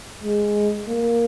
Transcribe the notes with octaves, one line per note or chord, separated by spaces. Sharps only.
G#3
A#3